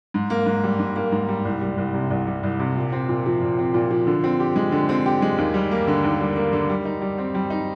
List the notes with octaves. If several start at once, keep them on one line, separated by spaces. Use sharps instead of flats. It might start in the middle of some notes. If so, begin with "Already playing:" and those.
G#2
A#3
G#2
G3
G#2
A#3
G#2
G3
C2
G3
C2
C3
C2
G3
C2
C3
A#2
C4
A#2
F3
A#2
C4
A#2
F3
D3
C4
G4
G#3
D3
C4
G4
G#3
D#2
G3
A#3
D3
D#2
G3
A#3
D3
G3
D#4
G3
C4
G3
D#4